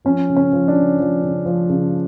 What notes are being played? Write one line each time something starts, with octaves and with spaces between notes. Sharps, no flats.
F3 C#4
C#3
C#4
F3
D4
C#3
F3
C#3
F3
C#3